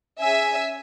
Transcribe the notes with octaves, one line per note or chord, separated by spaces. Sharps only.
C#4 G#4 E5 G#5